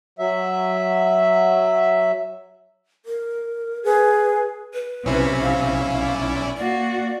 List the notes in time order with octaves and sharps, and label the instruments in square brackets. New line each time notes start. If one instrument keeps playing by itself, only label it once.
[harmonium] F#3 E5
[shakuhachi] A#4
[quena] G#4 [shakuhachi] B4
[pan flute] B4
[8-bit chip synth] B1 C#4 E4 [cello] C3
[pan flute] F5
[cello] D5
[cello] A#3 F#4 [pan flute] D5